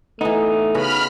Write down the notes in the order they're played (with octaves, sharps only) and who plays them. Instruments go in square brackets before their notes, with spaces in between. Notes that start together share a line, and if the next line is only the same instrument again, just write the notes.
[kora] E3 B3 [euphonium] A3 [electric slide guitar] D#4
[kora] C#3 B3 F#4 [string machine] B5 F6